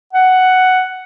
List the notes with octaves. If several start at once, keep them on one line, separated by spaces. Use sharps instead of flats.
F#5